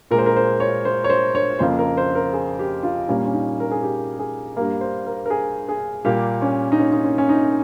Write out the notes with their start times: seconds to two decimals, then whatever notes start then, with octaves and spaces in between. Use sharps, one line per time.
0.11 A#2 G#3 A#4
0.18 C5
0.26 A#4
0.36 C5
0.60 C#5
0.85 C5
1.04 C#5
1.10 C5
1.35 C#5
1.59 F2 C#3 F3 A#3 C5
1.79 A#4
1.97 C5
2.15 A#4
2.33 G#4
2.59 G4
2.83 F4
3.08 A#2 G3 A#3 C#4
3.25 C#4
3.33 D#4
3.60 A#4
3.71 G#4
3.83 G4
4.19 G#4
4.57 G2 G3 A#3 A#4
4.81 C5
5.07 A#4
5.26 A#4
5.30 G#4
5.69 G#4
6.05 A#2 G3 A#3 G4
6.42 C#4
6.72 D#4
6.80 C#4
6.92 D#4
7.04 C#4
7.18 C#4
7.29 D#4